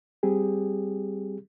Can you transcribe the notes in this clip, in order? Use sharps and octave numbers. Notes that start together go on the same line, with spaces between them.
G3 C4 G4 G#4